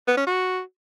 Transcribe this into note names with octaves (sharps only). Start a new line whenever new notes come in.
B3
C#4
F#4